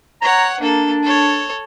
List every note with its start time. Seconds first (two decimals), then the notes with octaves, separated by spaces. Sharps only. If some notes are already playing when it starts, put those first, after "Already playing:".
0.21 C#5 F#5 A#5
0.60 A#3 D4 A4
1.03 A4 C#5